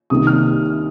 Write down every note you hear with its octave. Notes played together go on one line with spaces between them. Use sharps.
C2 C3 D#3 A#3 D#6
F6